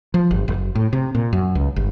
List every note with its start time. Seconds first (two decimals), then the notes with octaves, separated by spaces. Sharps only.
0.14 F3
0.31 G1
0.48 F#1
0.75 A2
0.93 C3
1.15 A#2
1.33 F#2
1.55 C#2
1.76 G1